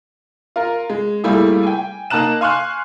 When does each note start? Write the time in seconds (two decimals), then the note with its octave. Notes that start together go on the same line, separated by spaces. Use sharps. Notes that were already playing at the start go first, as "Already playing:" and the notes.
0.56 F4 A#4
0.90 G#3
1.24 G3 A3 A#3 E4 F4 G#4
1.63 G5 G#5
2.10 A#3 D#4 A5 A#5 F#6 E7
2.41 F5 G#5 C6 C#6 F6 F#6